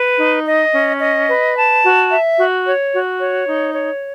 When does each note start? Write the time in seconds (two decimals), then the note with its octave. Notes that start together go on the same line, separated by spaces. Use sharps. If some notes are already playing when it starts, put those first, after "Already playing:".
Already playing: B4
0.18 D#4
0.46 D#5
0.73 C#4
1.00 D#5
1.28 B4
1.56 A5
1.83 F#4
2.10 E5
2.38 F#4
2.65 C#5
2.92 F#4
3.19 C#5
3.46 D#4
3.74 C#5